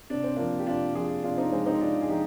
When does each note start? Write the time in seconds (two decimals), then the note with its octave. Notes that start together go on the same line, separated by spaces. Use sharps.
0.10 C3 D4
0.24 C4
0.36 F3 A#3 D4
0.59 G4
0.67 C3 D4 F4
0.95 F3 F4 G#4
1.23 C3 D4 F4
1.38 C4 D#4
1.52 F3 G#3 C4
1.66 C4 D#4
1.81 C3 D4 F4
2.01 G#4
2.09 F3 D#4 G4